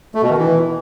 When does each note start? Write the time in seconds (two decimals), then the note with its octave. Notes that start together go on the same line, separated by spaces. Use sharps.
0.15 A3
0.22 B2
0.30 D#3
0.37 E3